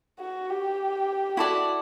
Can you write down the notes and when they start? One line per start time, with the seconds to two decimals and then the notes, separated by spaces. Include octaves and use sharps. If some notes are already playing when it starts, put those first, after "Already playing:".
0.20 F#4
0.49 G4
1.37 E4 F#4 A4 D5 F#5